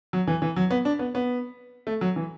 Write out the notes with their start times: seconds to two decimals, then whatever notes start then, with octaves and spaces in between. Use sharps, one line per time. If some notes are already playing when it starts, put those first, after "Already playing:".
0.13 F#3
0.27 E3
0.42 E3
0.56 F#3
0.71 B3
0.85 D4
0.99 B3
1.15 B3
1.87 A3
2.01 F#3
2.16 E3